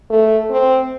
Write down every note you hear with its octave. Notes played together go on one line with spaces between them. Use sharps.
A3
C4